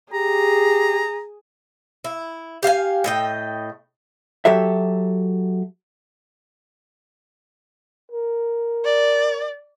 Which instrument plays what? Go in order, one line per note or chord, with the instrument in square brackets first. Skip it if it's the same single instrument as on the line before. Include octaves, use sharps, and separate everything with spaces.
[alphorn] G4 [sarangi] G#4 [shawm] A#5
[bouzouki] E4
G4 F5 F#5 G#5
A2 D#5 G5
[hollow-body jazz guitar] F#3 G4 A4 E5
[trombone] A#4
[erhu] D5